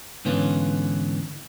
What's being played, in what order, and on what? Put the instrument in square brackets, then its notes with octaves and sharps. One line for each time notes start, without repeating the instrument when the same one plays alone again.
[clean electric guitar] G#2 D3 E3 B3 C#4 F4